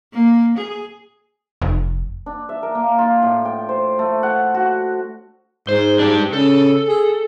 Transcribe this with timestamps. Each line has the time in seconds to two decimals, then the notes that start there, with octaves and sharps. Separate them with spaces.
0.14 A#3
0.58 G#4
1.62 F1
2.26 D4
2.49 E5
2.63 A#4
2.75 A#3
2.98 F4
3.22 A2
3.45 G5
3.69 C5
3.99 A3
4.23 F#5
4.54 F#4
5.69 G#2 C5
5.99 D4 G4
6.33 C#3 A4
6.88 G#4